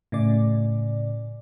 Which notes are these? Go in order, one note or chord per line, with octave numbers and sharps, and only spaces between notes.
A2 C#3 D5